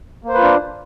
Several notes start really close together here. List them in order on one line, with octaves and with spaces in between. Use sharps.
A#3 C5 B4 F4 D4